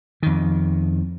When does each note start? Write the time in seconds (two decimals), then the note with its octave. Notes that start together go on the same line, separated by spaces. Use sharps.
0.23 F2 D#3